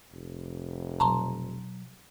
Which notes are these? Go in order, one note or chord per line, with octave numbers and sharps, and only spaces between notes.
F1
B2 F#3 A5 A#5 C6